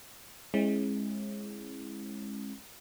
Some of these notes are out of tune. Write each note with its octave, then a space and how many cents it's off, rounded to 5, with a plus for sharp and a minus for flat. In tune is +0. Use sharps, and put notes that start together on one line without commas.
G#3 +0 C#4 -45 E4 -5